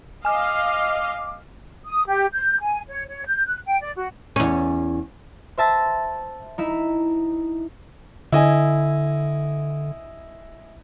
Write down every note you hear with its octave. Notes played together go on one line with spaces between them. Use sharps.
D#5 F5 G#5 D6 F6
D#6
G4
G6
G#5
C#5
C#5
G6
F#6
G5
D5
F#4
E2 C#4
C5 E5 A5 E6 A#6
D#4 E4 E5
D3 E4 D#5 G#5